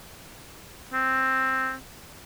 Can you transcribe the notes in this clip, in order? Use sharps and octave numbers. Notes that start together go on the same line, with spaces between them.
C4